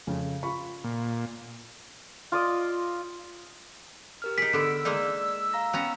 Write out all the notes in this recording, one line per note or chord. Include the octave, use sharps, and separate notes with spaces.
F2 C#3
F4 B5 C#6
A#2
F4 D5 D#5
G4 A#4 F6
D#4 G#4 B6 D7
D3 B3 E6
G#3 A#3 D#4 D5
F5 A#5 A#6
B3 C#4 G5 A#5